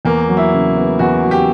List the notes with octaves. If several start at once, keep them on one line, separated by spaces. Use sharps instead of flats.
E2 A#3
F#3
E4
C#3
B3
E2 F#4
F#3
G4